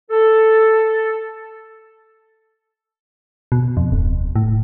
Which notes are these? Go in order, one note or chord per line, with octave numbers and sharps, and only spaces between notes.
A4
B2
F2
D1
A2